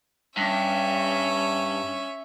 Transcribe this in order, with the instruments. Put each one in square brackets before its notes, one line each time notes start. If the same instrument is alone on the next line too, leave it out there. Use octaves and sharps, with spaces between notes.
[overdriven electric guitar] G2 [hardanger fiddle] C#4 E5